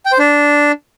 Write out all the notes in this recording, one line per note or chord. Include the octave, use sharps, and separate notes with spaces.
G5
C5
D4